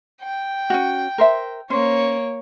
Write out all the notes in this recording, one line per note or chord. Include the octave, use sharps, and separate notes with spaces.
G5
C#4 D4 F#4
A#4 C5 E5
A#3 C#4 C5 C#5